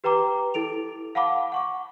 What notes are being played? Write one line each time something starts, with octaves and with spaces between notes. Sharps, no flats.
G4 B4 G5 A#5 D6
E4 A4 D7 F7
F5 F#5 A5 B5 D6
F#5 C#6 D6